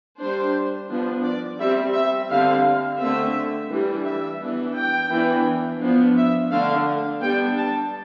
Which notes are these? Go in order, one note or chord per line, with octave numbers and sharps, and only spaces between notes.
G3 D4 C5
F3 B3 D4
D5
G3 C4 E5
E5
D3 G3 C4 F5
D3 A3 C4 E5
E3 G3 D4
E5
E3 B3 D4
G5
E3 B3 D4
F3 B3 D4
E5
D3 A3 D4 F5
G3 B3 D4 G5
A5